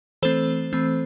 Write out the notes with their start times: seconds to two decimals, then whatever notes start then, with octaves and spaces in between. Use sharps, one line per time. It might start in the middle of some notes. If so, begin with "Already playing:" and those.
0.22 E3 A3 C4 A4 C5
0.73 E3 A3 C4